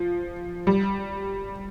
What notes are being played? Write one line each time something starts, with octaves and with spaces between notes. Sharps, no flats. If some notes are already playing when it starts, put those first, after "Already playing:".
Already playing: F3
G3